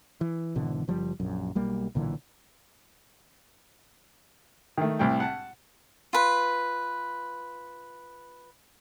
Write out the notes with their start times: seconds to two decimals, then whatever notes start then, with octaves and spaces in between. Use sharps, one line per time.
0.21 E3
0.55 G#1 B2 D3 E3
0.88 F#1 F3 G3
1.20 A#1 F#2
1.55 B1 G3 A#3
1.95 B1 A#2 D3 E3
4.78 D#3 A3
4.99 C2 A2 G5
5.20 F#5 A5
6.13 F4 B4